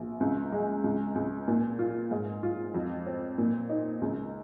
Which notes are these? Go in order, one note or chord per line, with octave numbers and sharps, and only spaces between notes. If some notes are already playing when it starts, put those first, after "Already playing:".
Already playing: A#1
C#2
G#3
C#2
C#2
A#2
F4
G#2
F4
F2
C4
A#2
D#4
C#2